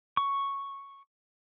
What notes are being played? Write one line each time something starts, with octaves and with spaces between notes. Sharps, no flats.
C#6